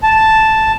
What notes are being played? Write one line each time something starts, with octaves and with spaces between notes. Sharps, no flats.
A5